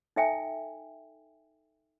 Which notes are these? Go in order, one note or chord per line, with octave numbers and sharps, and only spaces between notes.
D#4 A4 E5 G5 G#5